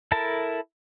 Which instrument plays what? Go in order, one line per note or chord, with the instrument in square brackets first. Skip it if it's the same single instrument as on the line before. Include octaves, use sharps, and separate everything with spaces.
[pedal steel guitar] E4 A4 A#4 A5